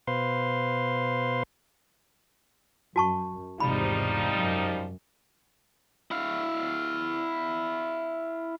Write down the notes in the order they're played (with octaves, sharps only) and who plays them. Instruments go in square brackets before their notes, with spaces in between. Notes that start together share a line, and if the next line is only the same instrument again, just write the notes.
[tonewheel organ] B2 B4 C5 F5 C6
[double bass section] F#2 [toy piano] F#4 A5 C#6
[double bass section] G#1 E2 C3 [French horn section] F3 G3 D#4 [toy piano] B5
[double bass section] F#2
[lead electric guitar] E4 F5